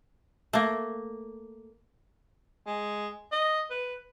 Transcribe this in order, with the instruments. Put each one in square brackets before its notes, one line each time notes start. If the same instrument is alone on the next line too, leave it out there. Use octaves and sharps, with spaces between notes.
[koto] A3 A#3
[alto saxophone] G#3
D#5
B4